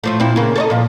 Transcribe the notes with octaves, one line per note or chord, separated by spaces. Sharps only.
A2 F3 A3
A#2 C4 E4
C#3 A#3
A4 C#5 D#5
A#2 F3